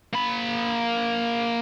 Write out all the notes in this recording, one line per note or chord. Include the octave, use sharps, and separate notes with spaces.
A#3 B5